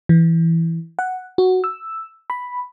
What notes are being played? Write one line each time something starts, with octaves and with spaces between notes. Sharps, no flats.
E3
F#5
F#4
E6
B5